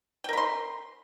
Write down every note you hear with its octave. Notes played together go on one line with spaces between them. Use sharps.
A#4 G5 B5 C6